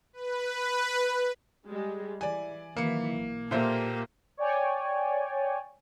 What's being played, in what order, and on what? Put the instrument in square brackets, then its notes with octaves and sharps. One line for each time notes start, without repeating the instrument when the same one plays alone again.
[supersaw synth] B4
[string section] G3 G#3
[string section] E3 [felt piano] D5 G#5
[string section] D#3 E3 F#3 [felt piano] A#3 C#7
[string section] B1
[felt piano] A#2 C5 E5 [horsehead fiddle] A#3 G4 [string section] A4
[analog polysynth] C#5 D5 G5 G#5